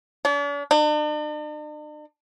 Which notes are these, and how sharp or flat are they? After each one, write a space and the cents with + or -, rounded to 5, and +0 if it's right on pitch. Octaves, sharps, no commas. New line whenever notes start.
D4 -45
D4 +45